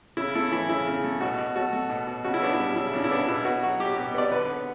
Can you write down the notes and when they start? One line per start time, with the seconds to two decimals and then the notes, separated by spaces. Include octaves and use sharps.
0.17 C#3 E4
0.35 A3 E4
0.52 E3 E4
0.69 C#3 E4
0.87 C#3
1.04 A3
1.20 B2 F#4
1.38 B2
1.56 A3 F#4
1.73 A3
1.90 B2
2.07 B2
2.24 C#3 F#4
2.34 E4
2.42 B3 D4
2.53 E4
2.59 G3
2.76 C#3 E4
2.93 C#3 D4
3.04 E4
3.11 B3 D4
3.28 B2 E4
3.45 B3 F#4
3.63 F#3 F#4
3.80 B2 G4
3.93 B2 G4
4.15 B3 D5
4.31 D3 B4
4.49 B3